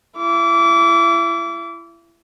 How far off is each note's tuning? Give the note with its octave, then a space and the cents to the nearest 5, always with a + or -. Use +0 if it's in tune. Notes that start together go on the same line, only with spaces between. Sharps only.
E4 +35 D6 -30